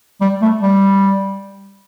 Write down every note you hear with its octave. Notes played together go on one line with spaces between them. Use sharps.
G3
A3
G3